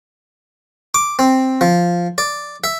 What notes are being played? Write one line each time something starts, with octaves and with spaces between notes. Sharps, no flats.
D6
C4
F3
D5
E5